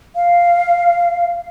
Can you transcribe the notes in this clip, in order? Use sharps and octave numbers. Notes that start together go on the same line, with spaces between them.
F5